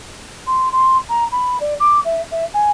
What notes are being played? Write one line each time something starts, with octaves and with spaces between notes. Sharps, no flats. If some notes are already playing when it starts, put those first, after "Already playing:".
C6
C6
A#5
B5
D5
D6
E5
E5
G#5